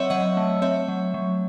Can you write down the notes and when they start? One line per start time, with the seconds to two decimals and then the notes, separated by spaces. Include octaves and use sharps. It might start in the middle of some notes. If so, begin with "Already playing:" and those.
Already playing: F#3 C4 C#5 D#5 E5 F#5 C#6 E6
0.10 F#3 D#5 F#5
0.37 A3
0.62 C4 C#5 E5
0.88 F#3
1.14 F#3